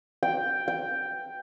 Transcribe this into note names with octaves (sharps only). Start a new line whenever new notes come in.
G5
G5